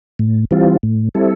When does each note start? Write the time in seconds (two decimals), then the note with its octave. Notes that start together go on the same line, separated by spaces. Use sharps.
0.19 A2
0.51 E3 G3 C4 F4
0.83 A2
1.15 G3 C4 E4 A4